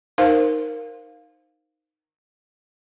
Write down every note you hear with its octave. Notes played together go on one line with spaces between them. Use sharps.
D#4 A#4 C5 F5